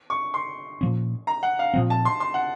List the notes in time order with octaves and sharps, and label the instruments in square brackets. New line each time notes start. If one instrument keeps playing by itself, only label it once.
[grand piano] C#6
C6
[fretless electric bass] A#2 F3 A#3 C#4
[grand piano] A#5
F#5
F5
[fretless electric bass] A#2 F3 C4
[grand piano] A5
C6
C6
F#5